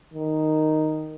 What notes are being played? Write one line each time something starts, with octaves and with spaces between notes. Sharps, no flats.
D#3